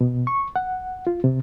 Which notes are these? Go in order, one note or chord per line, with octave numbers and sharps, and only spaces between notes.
B2
C#6
F#5
F4
C3